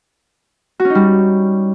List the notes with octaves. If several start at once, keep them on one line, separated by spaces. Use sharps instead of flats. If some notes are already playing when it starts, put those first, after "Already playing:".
F#4
C#4
D#4
G3